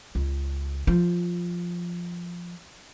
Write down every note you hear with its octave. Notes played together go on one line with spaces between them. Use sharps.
C#2
F3